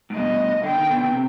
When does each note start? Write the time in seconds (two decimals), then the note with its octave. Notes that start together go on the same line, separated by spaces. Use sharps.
0.10 G#2
0.16 G2 B2 D#5
0.63 D3 G5
0.77 D#3
0.90 B2 D3
1.11 C3